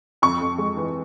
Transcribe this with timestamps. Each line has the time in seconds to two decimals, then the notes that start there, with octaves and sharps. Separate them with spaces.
0.22 F2 C#6
0.41 F2
0.58 G#3
0.77 E3